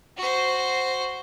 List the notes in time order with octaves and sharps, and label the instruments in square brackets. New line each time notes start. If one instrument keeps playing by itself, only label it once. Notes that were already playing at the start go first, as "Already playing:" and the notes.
[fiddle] F#4 C5